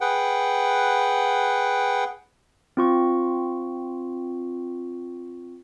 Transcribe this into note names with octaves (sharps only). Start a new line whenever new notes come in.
G#4 B4 F#5 G5
C4 F4 C#6